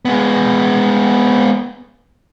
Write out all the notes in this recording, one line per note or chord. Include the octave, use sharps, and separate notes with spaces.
G#3 B3